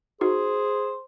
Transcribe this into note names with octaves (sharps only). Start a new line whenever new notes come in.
D#4 F#4 G#4 C5 C#6